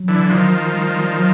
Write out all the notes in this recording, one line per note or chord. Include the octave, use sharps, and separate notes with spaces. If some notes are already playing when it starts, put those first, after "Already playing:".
Already playing: F#3
D3 E3
D#3 F3
G3
G3
F#3